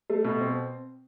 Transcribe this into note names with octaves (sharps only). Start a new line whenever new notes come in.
A3
B2
C4